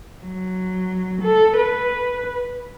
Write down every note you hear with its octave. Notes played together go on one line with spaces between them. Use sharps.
F#3
A4
B4